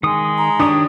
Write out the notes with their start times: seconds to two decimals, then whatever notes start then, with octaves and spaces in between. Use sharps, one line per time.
0.03 D#3 G#3 D#6
0.38 A#5
0.60 D#3 D4 G4 C#5 D#6